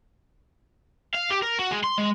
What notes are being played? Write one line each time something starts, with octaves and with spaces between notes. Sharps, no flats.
F5
G4
A#4
F#4
G#3
C6
G#3